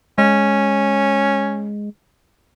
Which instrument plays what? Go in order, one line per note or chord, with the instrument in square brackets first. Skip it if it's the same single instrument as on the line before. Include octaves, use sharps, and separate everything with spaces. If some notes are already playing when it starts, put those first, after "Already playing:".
[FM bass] G#3 [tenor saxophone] C#4